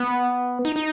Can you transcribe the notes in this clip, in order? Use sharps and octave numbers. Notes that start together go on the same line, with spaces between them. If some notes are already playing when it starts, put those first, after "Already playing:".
Already playing: B3
D#4
D#4